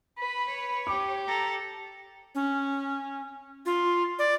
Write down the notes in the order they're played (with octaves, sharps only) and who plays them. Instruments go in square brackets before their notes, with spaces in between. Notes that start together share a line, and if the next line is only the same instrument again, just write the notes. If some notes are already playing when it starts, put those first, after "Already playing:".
[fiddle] B4 [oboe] B5
[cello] C#5
[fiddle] G4 [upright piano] D6
[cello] A4 [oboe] A#5
[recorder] C#4
F4
D5